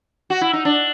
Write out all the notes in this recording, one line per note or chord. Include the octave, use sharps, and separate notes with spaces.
F#4
E4
D#4
D4